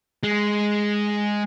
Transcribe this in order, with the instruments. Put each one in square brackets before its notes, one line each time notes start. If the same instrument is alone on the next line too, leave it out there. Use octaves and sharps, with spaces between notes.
[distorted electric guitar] G#3